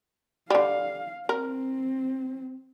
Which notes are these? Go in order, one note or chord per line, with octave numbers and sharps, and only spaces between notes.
D3 G3 F5
C4 A#4